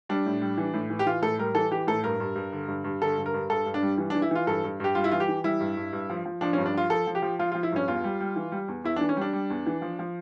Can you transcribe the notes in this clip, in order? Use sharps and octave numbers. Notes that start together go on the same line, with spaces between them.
G3 D4
A2
G3
E3
A2
E3
G4
E3 F4
A2 A4
G3 A#4
E3 A4
E3 G4
A2 A4
G2 A#4
G2
G2
D3
G2
G2
D3 A4
G2
A#4
G2
G2 A4
G2
D4
G3
E3
D4
E3
E4
E3 F4
G2 A4
G2
G2 G4
G3 F4
E4
E3 F4
G4
E3
G3 E4
G2
G2
G2
F3
F3
F3 D4
C#4
G2
D4
F3 F4
F3 A4
F3
G4
F3
F3 F4
F3 F4
E4
G2 C#4
E2 F4
G3
G3
E3
G3
E2
E2 E4
D4
E3
C#4
G3 D4
G3
E2
E3
F3
F3